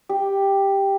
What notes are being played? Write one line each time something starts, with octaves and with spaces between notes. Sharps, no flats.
G4